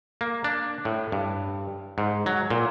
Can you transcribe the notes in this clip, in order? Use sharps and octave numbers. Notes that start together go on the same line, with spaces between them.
A#3
D4
A2
G2
G#2
F#3
A#2